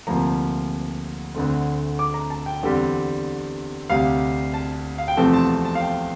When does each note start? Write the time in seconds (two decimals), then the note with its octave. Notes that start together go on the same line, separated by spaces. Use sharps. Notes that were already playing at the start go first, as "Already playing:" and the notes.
0.07 D2 C3 F3 A#3 A#5
1.35 D2 D3 A3 C4
1.99 D6
2.14 A#5
2.30 A5
2.46 G5
2.63 E2 D3 G3 C4
3.90 D2 C3 G3 F5
4.54 A5
4.98 F5
5.08 G5
5.17 E2 C3 F3 A3 C4 A5
5.33 A5
5.49 A5
5.65 A5
5.75 F5
5.81 G5